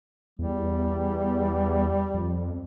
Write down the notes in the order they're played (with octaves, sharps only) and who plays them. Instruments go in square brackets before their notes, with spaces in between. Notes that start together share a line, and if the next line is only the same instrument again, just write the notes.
[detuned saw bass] E2 [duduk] G3
[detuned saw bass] E2
F2